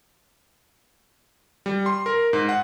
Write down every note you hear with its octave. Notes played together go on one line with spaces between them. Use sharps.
G3
C6
A#4
G#2
F#5